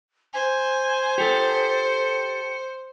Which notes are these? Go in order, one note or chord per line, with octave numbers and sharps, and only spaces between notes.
C5 G#5
G4 A4 C#7